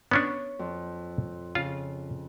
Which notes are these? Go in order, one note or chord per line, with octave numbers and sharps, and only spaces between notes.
B3 C#4 D4 C#5
F2
C#3 F4